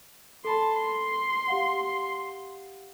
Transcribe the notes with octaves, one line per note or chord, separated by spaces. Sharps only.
A4 A5 B5 C6
C6
G4 F5 F#5